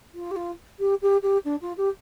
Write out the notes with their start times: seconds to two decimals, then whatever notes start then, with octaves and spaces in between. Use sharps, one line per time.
0.14 F4
0.31 G4
0.36 F4
0.79 G4
1.02 G4
1.22 G4
1.44 D4
1.61 F4
1.77 G4